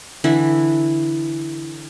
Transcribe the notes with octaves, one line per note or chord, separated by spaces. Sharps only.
D3 E3 E4